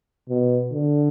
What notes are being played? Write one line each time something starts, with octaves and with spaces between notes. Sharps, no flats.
B2
D3